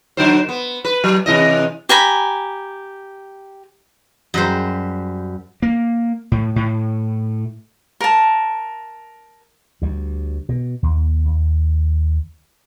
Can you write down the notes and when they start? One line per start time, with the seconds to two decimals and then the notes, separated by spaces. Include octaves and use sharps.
0.17 D3 F#3 C5
0.49 B3
0.85 B4
1.04 F#3
1.26 C3 E3 D#5
1.89 G4 G#5 A#5 B5
4.34 F#2 G3 C5
5.62 A#3
6.32 A2
6.56 A2
8.00 A#4 A5
9.82 D2 G3
10.49 B2
10.83 D#2
11.25 D#2